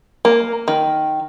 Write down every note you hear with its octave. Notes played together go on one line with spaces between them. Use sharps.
A#3
D#3